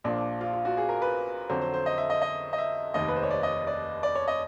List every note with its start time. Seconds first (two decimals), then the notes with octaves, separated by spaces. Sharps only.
0.04 A#1 A#2 F3 D4
0.41 F4
0.53 F4
0.65 F#4
0.77 G#4
0.89 A#4
1.02 B4
1.50 F2 D3 F#3 C5
1.62 C5
1.74 C5
1.86 D#5
1.98 E5
2.10 D#5
2.22 D#5
2.53 D#5
2.58 E5
2.94 F1 D#2 D#3 D#5
3.08 B4
3.16 C5
3.23 C#5
3.31 D5
3.43 D#5
3.67 D5
4.03 D5
4.15 C#5
4.28 D#5